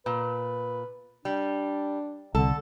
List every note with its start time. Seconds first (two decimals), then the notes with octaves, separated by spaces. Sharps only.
0.06 A#2 B4
1.25 G3 D4
2.35 C2 D3 A4